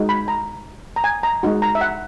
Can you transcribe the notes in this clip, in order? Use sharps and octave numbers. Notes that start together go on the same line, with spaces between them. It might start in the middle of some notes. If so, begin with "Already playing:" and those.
Already playing: G#3 D#4 F#4
B5
A#5
A#5
G#5
A#5
G#3 D#4 F#4
A#5
E5
F#5